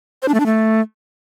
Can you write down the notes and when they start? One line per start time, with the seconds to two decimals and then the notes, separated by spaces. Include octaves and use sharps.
0.22 C5
0.28 D4
0.34 A3
0.40 D4
0.46 A3